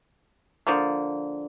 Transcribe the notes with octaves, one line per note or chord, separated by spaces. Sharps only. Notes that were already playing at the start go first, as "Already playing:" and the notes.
D3 F3 A#3